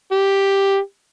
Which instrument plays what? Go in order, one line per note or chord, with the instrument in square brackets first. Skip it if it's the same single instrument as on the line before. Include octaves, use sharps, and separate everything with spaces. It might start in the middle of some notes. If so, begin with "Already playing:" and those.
[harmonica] G4